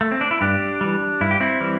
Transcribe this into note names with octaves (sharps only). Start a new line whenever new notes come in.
A3
C4
D4
E4
G2 D4 G4
E3 G3
G2 E4
G4
C4 E4
E3 G3